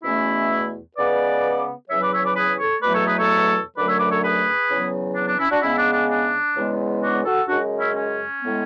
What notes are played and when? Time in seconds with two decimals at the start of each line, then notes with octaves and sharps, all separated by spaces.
0.03 E2 B2 A3 C#4 E4
0.97 C#3 G#3 B3 B4 D5
1.89 E2 C#3 F#3 C#5 E5
2.02 B4 D5
2.13 C#5 E5
2.25 B4 D5
2.36 G#4 B4
2.59 A4 C#5
2.83 E2 B2 F#3 A3 B4 D5
2.94 A4 C#5
3.06 G#4 B4
3.17 A4 C#5
3.76 F#2 D3 F#3 A3 B4 D5
3.87 C#5 E5
3.99 B4 D5
4.10 A4 C#5
4.22 G#4 B4
4.69 E2 C#3 F#3 B3
5.15 D4
5.27 D4
5.39 C#4 E4
5.50 D4 F#4
5.61 C#3 G#3 B3 C#4 E4
5.77 D4
5.93 D4
6.09 D4
6.55 E2 C#3 G#3 B3
7.02 D4 F#4
7.25 F#4 A4
7.47 F#2 C#3 G#3 D4 F#4
7.79 C#4 E4
7.94 C#4
8.41 A2 G#3 B3